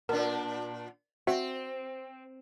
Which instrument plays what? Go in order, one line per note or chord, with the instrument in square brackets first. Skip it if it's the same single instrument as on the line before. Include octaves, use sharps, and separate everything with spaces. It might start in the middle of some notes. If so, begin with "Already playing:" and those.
[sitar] A#2 D4 [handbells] A#4
[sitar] C4 [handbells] F#4 E5 F#5